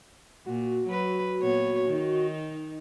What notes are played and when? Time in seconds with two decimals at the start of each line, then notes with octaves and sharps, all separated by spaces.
0.46 A#2 F#4
0.87 F#3 B4
1.39 A#2 B3 C#5
1.87 D#3 D#4